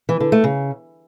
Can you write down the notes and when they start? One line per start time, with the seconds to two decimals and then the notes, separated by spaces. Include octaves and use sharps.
0.09 E3
0.20 D3
0.32 A3
0.44 C#3